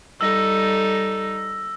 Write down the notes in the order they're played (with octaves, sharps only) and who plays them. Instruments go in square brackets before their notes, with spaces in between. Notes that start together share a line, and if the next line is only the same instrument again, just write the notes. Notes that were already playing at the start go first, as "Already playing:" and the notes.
[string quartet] G3 D#4 A4 [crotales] E6 A#6